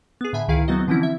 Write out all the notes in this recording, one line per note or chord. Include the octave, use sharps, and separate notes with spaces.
B3 G#4
A2 D3 E5 G#5 B5
C#2 D#3 E4 G#4 F5
F#3 B3 C4 F#4 D#5
D3 E3 F3 C4 C#4 E4
E5